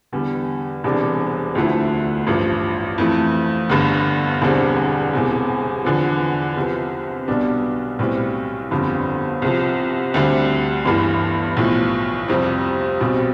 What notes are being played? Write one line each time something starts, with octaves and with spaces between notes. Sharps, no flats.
E2 D3 G3
E1 E2 C3 G3 D4
D2 D3 F3 A3 E4
A1 G2 F3
F2 E3 A3
G1 G2 D3
E1 E2 D3 G3 C4
E1 E2 C3
E2 D3 F3 B3
C2 C3 F3
B1 B2 G3 B3 D4
B1 A2 G3 C4
G1 F2 D3 G3
C2 C3 F3
D2 D3 G3 C4
G1 G2 E3
B1 A2 F3
F2 C3 G3 C4
B1 B2 G3 C4